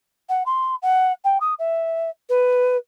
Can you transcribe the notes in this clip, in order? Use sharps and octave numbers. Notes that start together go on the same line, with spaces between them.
F#5
C6
F#5
G5
D#6
E5
B4